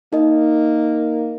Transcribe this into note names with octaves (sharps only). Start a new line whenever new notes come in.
A#3 D#4 D#5